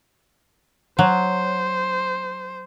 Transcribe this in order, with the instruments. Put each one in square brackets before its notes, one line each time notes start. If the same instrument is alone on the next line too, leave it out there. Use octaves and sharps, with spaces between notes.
[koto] F#3 [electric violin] C5